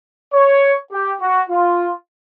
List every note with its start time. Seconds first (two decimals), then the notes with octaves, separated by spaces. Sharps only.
0.33 C#5
0.91 G4
1.21 F#4
1.49 F4